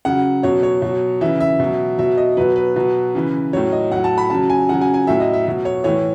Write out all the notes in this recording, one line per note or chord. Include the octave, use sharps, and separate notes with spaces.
C#3 F#3 F#5
B2 F#3 C#5
C#5
B2 F#3
C#3 E3 E5
E5
B2 F#3
B2 F#3 E5
D#5
B2 F#3 B4
B4
B2 F#3
C#3 E3
A2 F#3 C#5
D#5
A2 F#3 F#5
A5
B5
C#3 F#3 A5
G#5
C#3 F#3 F#5
G#5
G#5
A2 F#3 E5
D#5
E5
B2 F#3
C#5
A2 E3 C#5